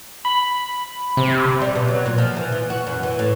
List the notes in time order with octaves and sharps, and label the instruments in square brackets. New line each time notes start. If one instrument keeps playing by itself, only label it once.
[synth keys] B5
[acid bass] C3
[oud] G3
B2
F#3
A#2
F3
E3
E3
F#4
F#2
E3
A2